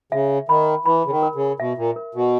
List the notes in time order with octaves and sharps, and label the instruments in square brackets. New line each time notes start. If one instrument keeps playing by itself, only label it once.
[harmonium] C#3 [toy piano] E5
[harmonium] D#3 [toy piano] B5
[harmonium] E3 [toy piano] B5
[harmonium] C#3
D#3
[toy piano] A#4
[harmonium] C#3
[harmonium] B2 [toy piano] E5
[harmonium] A#2
[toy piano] A#4
[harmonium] B2